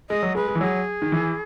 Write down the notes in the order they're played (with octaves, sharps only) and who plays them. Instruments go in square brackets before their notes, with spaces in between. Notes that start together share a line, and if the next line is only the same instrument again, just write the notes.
[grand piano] G#3 [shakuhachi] D#5
[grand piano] F#3
[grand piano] G#3 [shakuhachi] B4
[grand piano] G#3
E3
[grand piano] F#3 [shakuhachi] G#4
[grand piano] D#3
E3